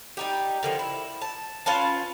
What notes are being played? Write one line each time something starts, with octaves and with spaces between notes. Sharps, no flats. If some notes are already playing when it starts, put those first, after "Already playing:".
G3 D#4 G4
D3 D#3 F3
E4
A5
C#4 F4 B4 A5